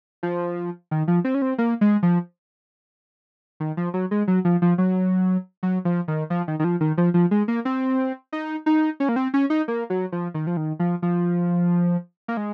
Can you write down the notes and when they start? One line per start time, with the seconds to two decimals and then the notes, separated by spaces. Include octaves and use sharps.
0.23 F3
0.91 D#3
1.08 F3
1.24 C4
1.34 C#4
1.42 C4
1.58 A#3
1.81 G#3
2.03 F3
3.60 D#3
3.77 F3
3.94 F#3
4.11 G#3
4.28 F#3
4.45 F3
4.62 F3
4.78 F#3
5.63 F#3
5.85 F3
6.08 D#3
6.30 F3
6.48 D#3
6.59 D#3
6.64 F3
6.81 D#3
6.98 F3
7.14 F3
7.31 G#3
7.48 A#3
7.65 C4
8.33 D#4
8.66 D#4
9.00 C#4
9.09 A#3
9.16 C4
9.34 C#4
9.50 D#4
9.68 A#3
9.90 F#3
10.12 F3
10.34 D#3
10.47 F3
10.57 D#3
10.79 F3
11.02 F3
12.28 A#3
12.37 G#3